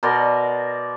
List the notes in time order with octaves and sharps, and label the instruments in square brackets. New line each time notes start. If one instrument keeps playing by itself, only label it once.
[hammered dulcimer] B2 A#4 D5 C6